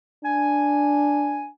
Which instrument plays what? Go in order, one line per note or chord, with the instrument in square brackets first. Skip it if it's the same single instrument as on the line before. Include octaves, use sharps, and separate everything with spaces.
[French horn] D4 [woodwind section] G#5